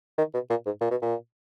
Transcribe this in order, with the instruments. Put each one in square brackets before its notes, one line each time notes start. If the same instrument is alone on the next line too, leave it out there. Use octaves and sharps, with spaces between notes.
[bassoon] D#3
B2
A#2
G#2
A#2
B2
A#2